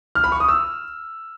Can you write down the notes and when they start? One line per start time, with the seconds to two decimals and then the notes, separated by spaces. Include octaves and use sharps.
0.15 F6
0.24 B5
0.32 C#6
0.40 D#6
0.49 E6